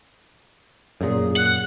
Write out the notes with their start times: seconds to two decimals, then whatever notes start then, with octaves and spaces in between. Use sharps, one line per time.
1.01 F#2 A#2 G#4
1.36 F#5 F#6